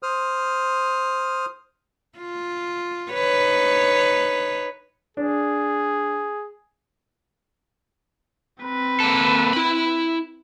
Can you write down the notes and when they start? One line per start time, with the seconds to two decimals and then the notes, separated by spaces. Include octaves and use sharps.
0.03 C5 D#6 F6
2.19 F4
3.11 D#4 B4 C#5
5.17 D4 G#4
8.63 C4 B4
9.00 A#3 A4
9.54 E4 B5